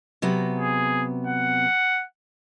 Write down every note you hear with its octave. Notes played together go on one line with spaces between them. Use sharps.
C3 F#3 B3
G#4
F#5